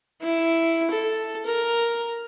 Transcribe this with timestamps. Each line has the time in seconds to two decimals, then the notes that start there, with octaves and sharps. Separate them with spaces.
0.21 E4
0.91 A4
1.46 A#4